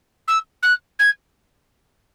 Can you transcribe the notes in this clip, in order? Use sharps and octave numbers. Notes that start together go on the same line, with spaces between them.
E6
F#6
G#6